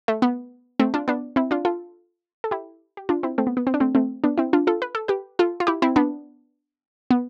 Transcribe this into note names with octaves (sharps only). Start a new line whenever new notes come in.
A3
B3
A3 C4
D4 F4
B3 D4
C4 E4
D4 F4
F4 A4
A4
E4 G4
G4
D4 F4
C4 E4
A3 C4
B3
B3
C4
D4
A3 C4
A3 C4
B3 D4
C4 E4
D4 F4
F4 A4
B4
A4
G4 B4
F4 A4
F4
E4 G4
C4 E4
B3 D4
B3